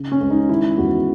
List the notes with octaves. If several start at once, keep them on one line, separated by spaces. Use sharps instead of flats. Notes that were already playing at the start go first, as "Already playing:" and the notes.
Already playing: C#3
C#4
C#2
D#4
D#3 E4
E2 F#4